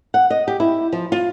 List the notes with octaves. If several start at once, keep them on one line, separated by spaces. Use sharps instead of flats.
F#5
D#5
G4
E4
F3
F4